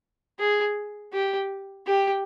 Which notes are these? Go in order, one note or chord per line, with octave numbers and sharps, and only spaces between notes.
G#4
G4
G4